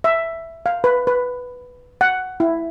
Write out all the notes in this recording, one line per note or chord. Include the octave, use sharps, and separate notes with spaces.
E5
F5
B4
B4
F#5
E4